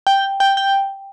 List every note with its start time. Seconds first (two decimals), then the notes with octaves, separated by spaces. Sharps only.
0.07 G5
0.40 G5
0.57 G5